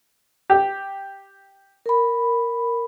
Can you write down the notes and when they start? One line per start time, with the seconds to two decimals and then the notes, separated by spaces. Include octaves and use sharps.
0.50 G4
1.86 A#4 B5